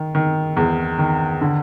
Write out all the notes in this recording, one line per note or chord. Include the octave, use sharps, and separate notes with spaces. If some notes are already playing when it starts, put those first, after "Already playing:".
Already playing: D#3
D#3
E2
D#3
D3